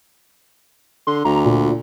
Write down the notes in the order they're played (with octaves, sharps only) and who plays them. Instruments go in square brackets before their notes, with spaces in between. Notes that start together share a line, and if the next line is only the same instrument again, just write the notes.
[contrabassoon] D3 [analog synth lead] C6
[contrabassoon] D2 [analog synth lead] A#5
[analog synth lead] A#2